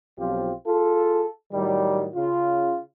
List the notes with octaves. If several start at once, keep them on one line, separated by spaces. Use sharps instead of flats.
B1 F3 C4 F4 G4
F4 G#4 A4
A2 D#3 F#3 G3
C#3 F4